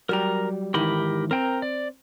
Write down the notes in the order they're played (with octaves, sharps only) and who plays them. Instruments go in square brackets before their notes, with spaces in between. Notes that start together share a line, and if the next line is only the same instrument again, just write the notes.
[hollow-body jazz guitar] F#3 G3 G4 [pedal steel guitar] A#4 A#5
[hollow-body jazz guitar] G#2 D#3 E3 [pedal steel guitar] G4 A#4 B5
[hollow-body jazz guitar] C4 [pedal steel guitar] A#4 G5 A#5
[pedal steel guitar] D5